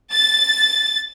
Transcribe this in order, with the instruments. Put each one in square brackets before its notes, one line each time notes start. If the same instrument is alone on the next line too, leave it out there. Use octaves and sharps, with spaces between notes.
[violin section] A6